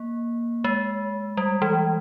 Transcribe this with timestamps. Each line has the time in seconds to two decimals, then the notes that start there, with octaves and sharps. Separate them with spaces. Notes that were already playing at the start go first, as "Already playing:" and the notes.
Already playing: A#3
0.64 G#3
1.37 G3
1.62 E3